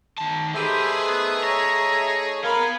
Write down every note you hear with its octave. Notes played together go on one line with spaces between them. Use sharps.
D#3 A5
A3 D#4 G4 G#4 B4 C5 E5
B3
C#5 A#5
B3 A#4 F5 G#5 B5